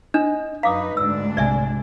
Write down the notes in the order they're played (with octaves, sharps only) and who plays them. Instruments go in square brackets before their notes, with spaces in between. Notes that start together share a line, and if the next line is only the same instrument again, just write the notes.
[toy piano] D4 [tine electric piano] D#5
[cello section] F#2 D#4 B4 [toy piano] F5 D6 D#6 [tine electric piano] A#5
[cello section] D2 G#2 D4 [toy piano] E6
[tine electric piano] B1 C3 G#3 [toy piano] D5 E5 G#5